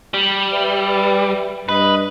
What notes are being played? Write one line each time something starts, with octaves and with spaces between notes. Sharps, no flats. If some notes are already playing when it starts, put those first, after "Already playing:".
G3
B4 D5 E5
G2 B4 D#5